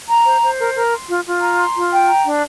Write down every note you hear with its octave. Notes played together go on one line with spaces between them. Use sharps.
A#5
C5
C5
A#4
A#4
C6
F4
F4
A#5
C6
F4
G5
A#5
D4